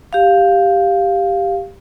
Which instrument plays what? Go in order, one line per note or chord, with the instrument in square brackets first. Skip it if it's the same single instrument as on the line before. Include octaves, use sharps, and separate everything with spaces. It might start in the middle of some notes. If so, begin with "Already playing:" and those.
[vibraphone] G4 F5